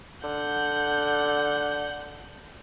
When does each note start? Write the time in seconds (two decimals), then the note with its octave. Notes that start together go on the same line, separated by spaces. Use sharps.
0.23 D3 F#5 G6